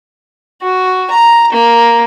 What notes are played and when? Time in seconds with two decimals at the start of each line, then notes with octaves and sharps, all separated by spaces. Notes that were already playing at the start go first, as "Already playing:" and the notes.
0.62 F#4
1.10 A#5
1.52 A#3